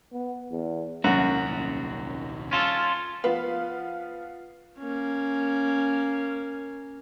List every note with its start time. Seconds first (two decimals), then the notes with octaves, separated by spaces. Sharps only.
0.13 B3
0.51 E2
1.04 D#1 C2 F#2 F#4
2.51 C#4 F4 A4
3.24 F3 B3 B4 F5
4.80 A#3 C#4